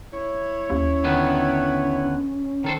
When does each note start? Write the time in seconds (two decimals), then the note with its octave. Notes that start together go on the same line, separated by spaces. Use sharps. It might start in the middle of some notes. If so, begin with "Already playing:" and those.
0.12 E4 C#5
0.70 D#2 C#4
1.04 D3 D#3 B3
2.64 D#3 A4 C5